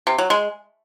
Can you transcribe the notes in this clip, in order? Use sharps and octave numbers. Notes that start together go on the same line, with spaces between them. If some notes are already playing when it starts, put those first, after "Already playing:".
C3
F#3
G#3